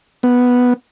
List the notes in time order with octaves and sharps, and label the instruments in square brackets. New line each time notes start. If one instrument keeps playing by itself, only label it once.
[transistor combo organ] B3